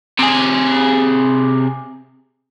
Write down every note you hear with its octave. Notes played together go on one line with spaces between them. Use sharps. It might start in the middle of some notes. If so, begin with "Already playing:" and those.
C3 G#4